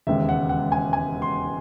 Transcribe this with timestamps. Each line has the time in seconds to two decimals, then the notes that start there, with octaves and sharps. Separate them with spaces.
0.07 E1 D#2 C#3 G#3 E5
0.29 F#5
0.49 F#5
0.72 G#5
0.93 G#5
1.22 C6